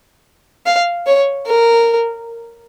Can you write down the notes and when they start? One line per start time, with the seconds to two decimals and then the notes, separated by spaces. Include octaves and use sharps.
0.66 F5
1.07 C#5
1.47 A#4